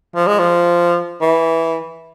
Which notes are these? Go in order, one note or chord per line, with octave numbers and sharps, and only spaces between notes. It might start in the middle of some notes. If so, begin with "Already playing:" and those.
F3
G#3
F3
E3